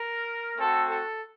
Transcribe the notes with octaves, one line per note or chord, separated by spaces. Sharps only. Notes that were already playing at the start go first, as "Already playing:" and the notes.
Already playing: A#4
A3 C4 F#4 A4
A4